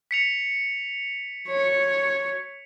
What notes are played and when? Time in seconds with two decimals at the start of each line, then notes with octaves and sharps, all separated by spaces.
0.11 B6 C#7 F7
1.48 C#5